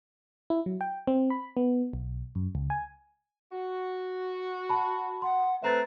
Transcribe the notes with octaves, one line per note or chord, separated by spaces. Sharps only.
E4
F#3
G5
C4
B5
B3
B1
F#2
C#2
G#5
F#4
A5 B5
F#5 C6
A3 C4 B4 E5 A#5 A6